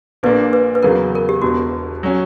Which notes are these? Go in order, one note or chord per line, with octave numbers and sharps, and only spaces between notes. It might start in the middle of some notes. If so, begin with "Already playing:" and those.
A#1 A#2 A#3 D4 B4
B4
B4
E2 C#3 F#3 B3 A#4
A#4
G4
E1 E2 B2 F#4
F#3 C#4